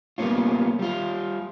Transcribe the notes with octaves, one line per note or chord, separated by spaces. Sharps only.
G3 A#3 B3 C#4 F4
G3 F4